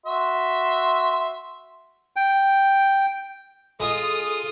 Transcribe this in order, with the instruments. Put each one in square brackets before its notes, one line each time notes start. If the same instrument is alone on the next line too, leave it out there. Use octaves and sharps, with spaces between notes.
[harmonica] F#4 E5 C6
[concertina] G5
[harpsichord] G#3 D#5 [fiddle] F4 D#6 [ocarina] A4